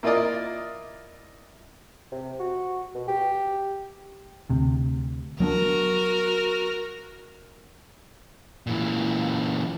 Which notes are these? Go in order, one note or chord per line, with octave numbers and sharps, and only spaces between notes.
A#3 E4 F4 A#4 D5 D#5
C3
F#4
B2
G4
D2 C3
F#3 B3 D4 F#4 A#4
A#2 E3